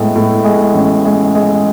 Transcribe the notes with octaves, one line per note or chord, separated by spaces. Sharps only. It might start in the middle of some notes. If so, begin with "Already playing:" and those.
Already playing: A2 G#3 B3
A2
G#3
A1
G#3
G#3